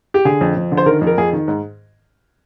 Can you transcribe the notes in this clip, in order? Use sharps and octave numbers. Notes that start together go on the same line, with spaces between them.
G4
D3 G#4
F2
F2
D3
C5
D#3 A#4
F2
A#4
F2 G#4
D#3
G#2